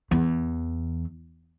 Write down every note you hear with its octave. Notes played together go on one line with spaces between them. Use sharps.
E2